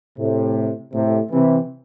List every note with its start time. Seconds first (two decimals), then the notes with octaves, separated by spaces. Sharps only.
0.18 A2 C3
0.93 A2 C3
1.31 C3 E3